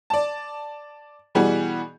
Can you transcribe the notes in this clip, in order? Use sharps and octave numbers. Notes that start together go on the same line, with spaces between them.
D5 A5
B2 E3 G3 F#4 G#4